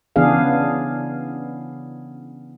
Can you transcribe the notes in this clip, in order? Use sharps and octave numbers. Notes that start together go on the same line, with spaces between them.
C#3 E3 B3 D4 G#4 F5